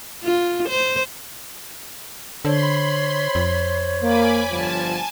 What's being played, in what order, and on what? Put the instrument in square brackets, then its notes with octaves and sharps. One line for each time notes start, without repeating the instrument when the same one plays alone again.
[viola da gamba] F4
C5
[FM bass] D3 [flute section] C5 C#5 [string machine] B5 C6
[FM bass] F2
[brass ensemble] A#3 [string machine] G#5 B5 D6
[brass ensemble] G1 D3 F3 [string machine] G#5 A5